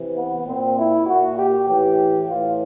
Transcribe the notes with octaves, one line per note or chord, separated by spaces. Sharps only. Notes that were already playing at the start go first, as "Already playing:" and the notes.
Already playing: C3 E3
B3
A#2 C4
E4
A#2 F#4
G4
A2 E3 G4
A2 E3 F4